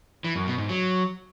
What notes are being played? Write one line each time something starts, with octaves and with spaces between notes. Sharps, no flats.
E3
F#2
B2
G#2
F#3